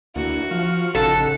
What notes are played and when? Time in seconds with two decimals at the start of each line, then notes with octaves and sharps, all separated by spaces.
0.16 D2 A#3 D4 E4 F#4
0.51 F3 F4 F5 C#6
0.95 A1 C#3 D#4 A4 F#5